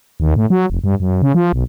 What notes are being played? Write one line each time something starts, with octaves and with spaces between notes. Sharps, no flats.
D#2
A2
F#3
F1
G2
F#2
C#3
F3
B1